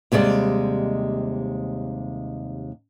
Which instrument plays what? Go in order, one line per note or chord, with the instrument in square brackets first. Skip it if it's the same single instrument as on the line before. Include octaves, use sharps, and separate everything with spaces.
[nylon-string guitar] D#2 C3 G3 G#3 D5